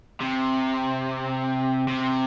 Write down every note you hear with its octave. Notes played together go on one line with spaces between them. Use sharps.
C3
C3